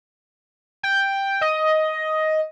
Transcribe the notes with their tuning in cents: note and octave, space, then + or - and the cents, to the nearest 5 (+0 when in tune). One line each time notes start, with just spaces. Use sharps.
G5 +5
D#5 +10